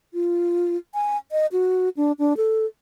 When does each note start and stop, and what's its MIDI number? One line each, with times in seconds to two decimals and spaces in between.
0.14 0.77 65
0.94 1.17 80
1.32 1.46 75
1.52 1.89 66
1.97 2.12 62
2.19 2.36 62
2.37 2.65 69